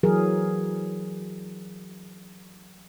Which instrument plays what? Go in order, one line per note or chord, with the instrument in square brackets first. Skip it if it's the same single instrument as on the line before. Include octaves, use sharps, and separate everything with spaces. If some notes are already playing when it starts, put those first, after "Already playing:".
[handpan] E3 F#3 G#4 A#4